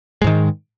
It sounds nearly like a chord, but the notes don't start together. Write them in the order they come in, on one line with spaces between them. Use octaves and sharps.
G#3 G#2 D#3